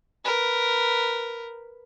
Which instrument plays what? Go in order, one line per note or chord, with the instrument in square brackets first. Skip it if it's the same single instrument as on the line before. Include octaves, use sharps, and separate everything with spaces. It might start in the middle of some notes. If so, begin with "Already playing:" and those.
[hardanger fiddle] A#4 B4